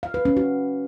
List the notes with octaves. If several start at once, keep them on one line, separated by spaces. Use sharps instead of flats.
F5
B4
C#4
F#4